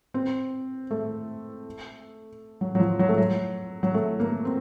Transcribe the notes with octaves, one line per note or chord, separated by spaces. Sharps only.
C4
A3
F#3
F#3
F3
F#3
A3
F#3
F#3
A3
A#3
C4